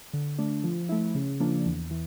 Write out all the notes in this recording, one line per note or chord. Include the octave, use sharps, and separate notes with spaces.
D3
A3 D4
F3
A3 E4
C#3
F3 A#3 D4
E2
E3